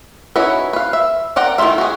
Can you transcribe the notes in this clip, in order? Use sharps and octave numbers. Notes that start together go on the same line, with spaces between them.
C#4 D#4 E4 F#4 B4
B4 F5
E5
A#4 D5 F#5 G5 A#5
D#3 E3 A3 F4 E5
F#4 G#4